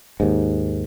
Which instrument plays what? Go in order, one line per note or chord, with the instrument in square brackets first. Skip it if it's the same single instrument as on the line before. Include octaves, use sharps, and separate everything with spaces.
[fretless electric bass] D#2 G#2